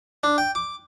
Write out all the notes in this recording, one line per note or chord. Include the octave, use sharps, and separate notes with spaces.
D4
G5
D6